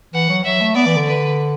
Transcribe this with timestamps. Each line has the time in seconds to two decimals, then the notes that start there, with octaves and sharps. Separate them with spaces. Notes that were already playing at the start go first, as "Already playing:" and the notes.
0.14 E3 F#5
0.29 F#3
0.45 F#3 E5
0.61 A3
0.75 B3 D5
0.86 E3
0.96 D3
1.07 B4